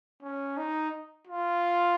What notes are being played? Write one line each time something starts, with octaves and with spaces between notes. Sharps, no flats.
C#4
D#4
F4